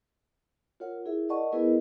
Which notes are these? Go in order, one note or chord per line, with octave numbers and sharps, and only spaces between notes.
F4 A#4 C#5 F#5
E4 G#4 A#4 E5
A#4 D5 D#5 F#5 A5 C#6
B3 E4 G#4 A#4 B4 D#5